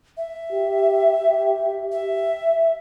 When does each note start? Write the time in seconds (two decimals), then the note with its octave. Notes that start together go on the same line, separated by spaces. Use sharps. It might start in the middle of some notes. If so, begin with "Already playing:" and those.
0.17 E5
0.53 G4
1.92 E5